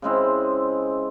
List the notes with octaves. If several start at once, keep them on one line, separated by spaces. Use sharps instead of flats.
C#3 G#3 C4 E4